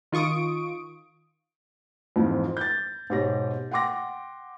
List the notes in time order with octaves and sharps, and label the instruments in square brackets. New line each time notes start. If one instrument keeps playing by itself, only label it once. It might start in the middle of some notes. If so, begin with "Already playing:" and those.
[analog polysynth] D#3 F4 C#6 D#6 D7
[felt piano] F2 G#2 E3 F3
G6 A6
G#2 B2 G4 C#5 A#6
F#5 G5 C6 D6 A#6